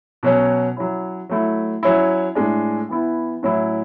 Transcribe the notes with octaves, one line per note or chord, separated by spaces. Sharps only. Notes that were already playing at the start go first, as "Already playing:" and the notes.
B2 F#3 C#4
F#3 C#4 E4
F#3 A3 E4
F#3 C#4 E4
A2 G#3 D4
E3 B3 E4
A2 F#3 C#4 E4